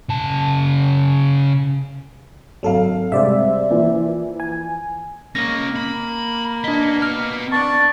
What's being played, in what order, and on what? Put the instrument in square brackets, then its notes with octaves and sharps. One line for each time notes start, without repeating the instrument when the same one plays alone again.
[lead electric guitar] C#3 A5
[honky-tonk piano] G#1 F5 [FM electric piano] F#3 A4
[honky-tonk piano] C3 G3 G#3 [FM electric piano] C5 D5 E5
[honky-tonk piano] E3 F3 A#3
[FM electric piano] G#5
[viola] A#3 [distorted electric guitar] C#4 D#5 [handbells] A#6
[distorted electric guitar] B5
[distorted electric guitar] B3 D#5 [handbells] D4 B6
[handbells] F6
[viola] B3 D4 [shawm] A5 [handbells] C#6